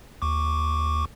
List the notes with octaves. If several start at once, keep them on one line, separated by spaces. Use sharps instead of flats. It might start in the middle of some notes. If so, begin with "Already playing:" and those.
D#2 C#6 D6